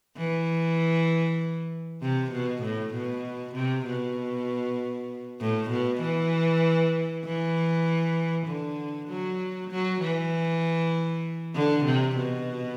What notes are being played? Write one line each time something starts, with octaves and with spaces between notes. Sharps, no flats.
E3
C3
B2
A2
B2
C3
B2
A2
B2
E3
E3
D3
F#3
F#3
E3
D3
C3
B2